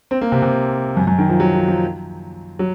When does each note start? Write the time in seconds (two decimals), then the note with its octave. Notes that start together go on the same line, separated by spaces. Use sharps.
0.11 C4
0.21 A#3
0.32 C3
0.42 C3
0.97 F#2
1.07 F#2
1.18 D#3
1.29 F3
1.40 F#3
1.54 F3
1.68 F3
2.59 F#3